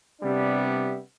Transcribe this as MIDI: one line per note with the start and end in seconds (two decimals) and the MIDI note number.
0.21 0.98 48
0.21 0.98 55
0.21 0.98 59
0.21 0.98 62
0.21 0.98 64